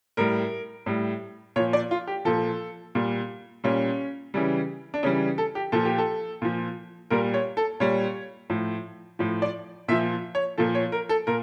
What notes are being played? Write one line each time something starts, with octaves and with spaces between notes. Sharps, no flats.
A2 G3 A#4
A2 G3
A#2 F3 C#5
D5
F4
G4
A#2 F3 A4
A#2 G3
A#2 G3 C#4
C#3 E3 G3
D4
C#3 E3 G3 C#4
A4
G4
A#2 F3 A4
G4
A4
A#2 F3
A#2 G3 A#4
C#5
A4
A#2 G3 C#5
A2 F3
A2 F3
D5
A#2 F3 E5
C#5
A#2 F3 A4
C#5
A#4
A4
A#2 A#4